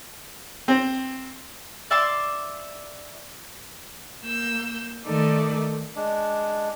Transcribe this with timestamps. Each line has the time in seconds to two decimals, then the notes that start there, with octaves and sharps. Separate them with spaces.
0.68 C4
1.90 D5 E5 C6 D6
4.23 A#3 E6 G6
5.04 D#3 A3 D#4 A4 A#4 D5
5.96 G#3 D4